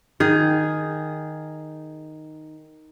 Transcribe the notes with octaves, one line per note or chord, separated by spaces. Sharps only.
D#3 G#4